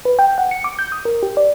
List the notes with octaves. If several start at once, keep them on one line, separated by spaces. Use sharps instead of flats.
B4
G5
F#5
C#7
D6
G6
D#6
A#4
G4
D5